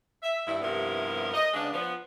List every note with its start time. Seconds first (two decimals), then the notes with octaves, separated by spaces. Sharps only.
0.23 E5
0.46 G2 D#3 G3 E4
0.61 G2 C3 F3 B3 E4 A#4
1.33 D#5
1.54 C#3 G#3 B3 D4
1.73 F3 B3